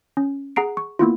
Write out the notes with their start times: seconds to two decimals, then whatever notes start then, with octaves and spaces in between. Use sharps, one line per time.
0.17 C#4
0.56 G#4 F#5 A#5 C7 D7
0.77 C#6
0.99 A#3 B3 E4 F4